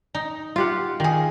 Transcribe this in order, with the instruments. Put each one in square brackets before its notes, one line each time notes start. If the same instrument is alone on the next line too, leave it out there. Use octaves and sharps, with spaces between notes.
[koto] D#4
[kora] F4 G4 F#5
[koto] D#3 G#4